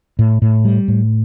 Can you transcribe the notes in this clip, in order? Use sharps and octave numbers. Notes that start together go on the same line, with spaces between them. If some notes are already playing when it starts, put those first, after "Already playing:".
A2
A2
G3
A2